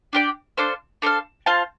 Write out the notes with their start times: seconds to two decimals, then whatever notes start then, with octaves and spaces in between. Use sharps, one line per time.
0.13 D4 G4 D5 G5
0.57 D4 A4 C5 F5
1.02 D4 A4 C5 F5
1.46 F4 C5 F5 A5